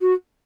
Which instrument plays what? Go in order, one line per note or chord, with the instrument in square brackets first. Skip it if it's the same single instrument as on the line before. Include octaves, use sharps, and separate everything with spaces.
[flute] F#4